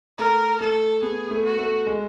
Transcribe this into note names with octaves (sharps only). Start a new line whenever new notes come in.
A3 A#4
A3 A4
B3 G#4
A3
F#4
A3
G#3